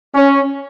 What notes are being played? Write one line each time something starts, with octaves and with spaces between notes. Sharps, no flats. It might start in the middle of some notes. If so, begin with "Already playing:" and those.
C#4